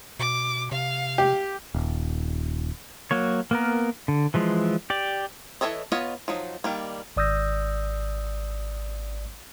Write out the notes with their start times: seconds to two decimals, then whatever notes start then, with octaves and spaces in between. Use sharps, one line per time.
0.19 B2 D6
0.72 C3 F5
1.18 G4
1.74 D#1
3.11 F#3 A#3 C#5
3.51 A#3 B3 A#4
4.08 D3
4.34 E3 F3 G#3
4.90 G4 D5
5.61 E3 G#4 A4 C#5 D#5
5.92 B3 F4 C#5 D#5
6.28 F3 F#3 D#4
6.64 D#3 G3 A#3
7.17 G#1 D5 D#6 E6 G6 A#6